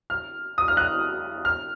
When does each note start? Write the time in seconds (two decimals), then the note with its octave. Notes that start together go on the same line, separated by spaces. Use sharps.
0.10 F6
0.58 D#6
0.68 F6
0.77 F#6
1.45 F6